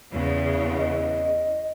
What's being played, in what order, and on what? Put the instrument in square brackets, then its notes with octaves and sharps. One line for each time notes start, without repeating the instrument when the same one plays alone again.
[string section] E2 C#3
[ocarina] D#5